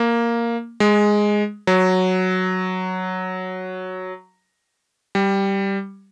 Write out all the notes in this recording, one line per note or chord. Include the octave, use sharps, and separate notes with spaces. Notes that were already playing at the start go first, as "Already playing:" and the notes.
Already playing: A#3
G#3
F#3
G3